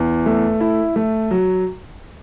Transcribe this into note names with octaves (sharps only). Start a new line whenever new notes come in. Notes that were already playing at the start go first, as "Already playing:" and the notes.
Already playing: E2
A3
E4
A3
F#3